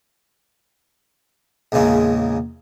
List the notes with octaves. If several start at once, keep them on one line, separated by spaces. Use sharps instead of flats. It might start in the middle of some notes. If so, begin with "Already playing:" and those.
A#1 E2 C#3 G#3 A#3